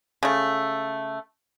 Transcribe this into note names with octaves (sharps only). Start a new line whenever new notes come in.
C#3 A3